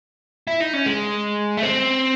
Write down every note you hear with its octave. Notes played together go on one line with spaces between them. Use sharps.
E4
D#4
C#4
G#3
A3
C4